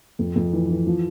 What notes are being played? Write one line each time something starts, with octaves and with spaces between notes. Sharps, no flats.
F2
F2
E3
E3
F3